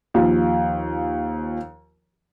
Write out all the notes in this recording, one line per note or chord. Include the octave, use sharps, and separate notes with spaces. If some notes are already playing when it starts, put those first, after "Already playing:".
D#2 F3